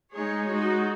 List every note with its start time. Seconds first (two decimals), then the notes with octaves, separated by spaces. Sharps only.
0.12 G#3 D#4 G#4 C#5
0.48 G#3 D#4 F#4